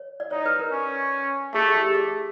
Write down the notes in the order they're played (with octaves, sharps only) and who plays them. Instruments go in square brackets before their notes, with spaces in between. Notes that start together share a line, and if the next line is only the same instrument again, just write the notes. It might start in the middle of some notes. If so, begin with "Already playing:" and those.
Already playing: [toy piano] C#5
D5
[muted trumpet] D#4 [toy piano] C#5
[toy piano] B4
A#4
[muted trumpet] C#4
[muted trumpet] A3 [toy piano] G#4
[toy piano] G#4
G4
G#4